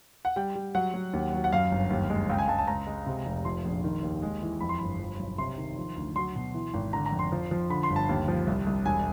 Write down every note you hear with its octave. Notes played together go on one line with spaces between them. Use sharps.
F#5
G3 G5
G3
F#3 F#5
F#3
D#2
F#3
F#5
F#2 F5
G1
D#2
G#3
C#2 G5
G#5
C#2 A5
A5
C#2 A#5
G#3
C3
F1
F3 C6
A#1
D#3
D#2
G#3
E3
F2 B5
C6
G1 B5
F3
B1
C3 C6
D#3
F3
D2
F#3 C6
B2
E3
G#1
D3 A#5
A#5
F2
C6
F3
F3
D3 B5
C6
G1
A5
D#2
F3
C2
C2
E1 G#5